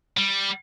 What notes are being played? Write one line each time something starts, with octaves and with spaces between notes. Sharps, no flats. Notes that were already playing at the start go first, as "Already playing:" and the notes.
G3